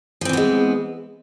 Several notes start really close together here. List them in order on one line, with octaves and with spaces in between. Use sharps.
F3 C4 E3 B3 G#3